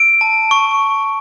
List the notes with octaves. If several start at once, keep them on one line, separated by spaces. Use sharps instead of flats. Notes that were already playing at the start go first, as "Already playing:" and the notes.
Already playing: E6 D7
A5
C#6